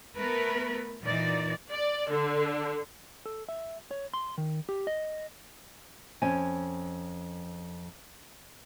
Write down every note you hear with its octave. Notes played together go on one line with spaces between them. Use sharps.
A3 B3 A#4 B4
A#2 E3 D#4 D5
D5
D3
A4
E5
C#5
C6
D#3
G4
D#5
F2 C#4 G#5